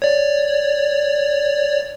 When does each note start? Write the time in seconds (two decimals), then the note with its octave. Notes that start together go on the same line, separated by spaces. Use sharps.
0.02 C#5 D5